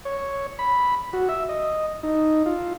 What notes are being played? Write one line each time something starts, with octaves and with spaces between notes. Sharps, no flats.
C#5
B5
F#4
E5
D#5
D#4
F4